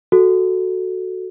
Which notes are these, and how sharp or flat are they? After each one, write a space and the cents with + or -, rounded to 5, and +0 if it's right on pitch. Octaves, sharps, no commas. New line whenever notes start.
F#4 +0 A4 +0